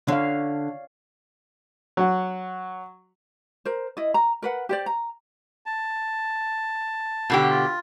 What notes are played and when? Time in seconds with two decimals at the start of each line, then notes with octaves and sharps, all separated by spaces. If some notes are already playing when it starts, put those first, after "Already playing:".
0.08 D3 C#5 D5 F5
1.97 F#3 F#5
3.65 A#4 C5
3.97 E4 D#5
4.14 A#5
4.42 A#4 B4 F#5
4.69 G4 C5 D5
4.86 A#5
5.66 A5
7.30 B2 D3 G4
7.50 F4